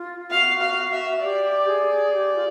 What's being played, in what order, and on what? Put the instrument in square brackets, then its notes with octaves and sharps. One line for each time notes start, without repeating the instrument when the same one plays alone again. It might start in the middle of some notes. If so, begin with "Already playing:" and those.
Already playing: [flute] F4
[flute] F#4 [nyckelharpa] F5
[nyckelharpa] F5
E5
[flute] G4 [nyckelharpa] D5
[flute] G#4
G4
F4